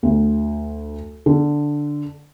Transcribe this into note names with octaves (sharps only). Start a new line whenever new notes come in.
D2
D3